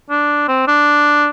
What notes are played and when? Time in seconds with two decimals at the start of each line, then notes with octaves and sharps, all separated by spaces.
0.10 D4
0.48 C4
0.68 D4